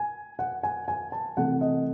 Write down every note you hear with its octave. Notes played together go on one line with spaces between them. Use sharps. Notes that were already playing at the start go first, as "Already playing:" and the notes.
Already playing: G#5
F#5
G#5
G#5
A5
C3 E3 A3 F#5
D#5